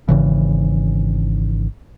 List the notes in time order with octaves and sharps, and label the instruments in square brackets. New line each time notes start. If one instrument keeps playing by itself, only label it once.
[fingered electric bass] G#1 C#3 E3